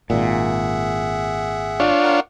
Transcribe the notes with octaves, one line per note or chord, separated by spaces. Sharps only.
G#1 A#2 G#4 E5 F#5
D4 F4 C#5
A#4 F#5